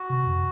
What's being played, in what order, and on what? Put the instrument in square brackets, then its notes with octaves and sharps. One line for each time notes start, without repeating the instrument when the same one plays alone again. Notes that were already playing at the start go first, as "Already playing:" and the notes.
Already playing: [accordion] F#4
[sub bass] C3
F2